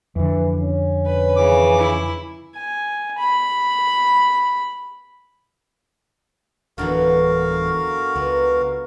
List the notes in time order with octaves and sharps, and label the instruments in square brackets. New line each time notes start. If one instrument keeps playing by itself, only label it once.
[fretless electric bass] F2 D3 [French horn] E3
[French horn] C#4
[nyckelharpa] B4
[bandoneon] C#3 E3 D6
[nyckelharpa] E4
G#5
B5
[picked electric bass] D1 E3 [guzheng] D3 F#3 B3 [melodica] F#4 A#4 F5
[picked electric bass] C#2 [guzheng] B3